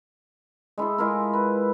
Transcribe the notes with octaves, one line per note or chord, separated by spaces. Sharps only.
G#3 E4 G#4 A4
G#3 E4 F4 A#4
B4